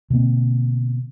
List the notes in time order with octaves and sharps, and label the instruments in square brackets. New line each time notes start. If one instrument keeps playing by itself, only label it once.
[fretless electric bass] B2 D3 A#3 C4